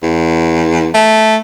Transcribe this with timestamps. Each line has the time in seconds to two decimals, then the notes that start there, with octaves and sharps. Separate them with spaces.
0.03 E2
0.94 A3